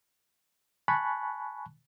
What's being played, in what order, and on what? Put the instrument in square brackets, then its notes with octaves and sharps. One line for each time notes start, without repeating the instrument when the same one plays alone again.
[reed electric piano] G#5 A5 B5 C#6 F#6